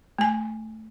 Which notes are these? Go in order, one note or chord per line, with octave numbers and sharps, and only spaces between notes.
A3 G#5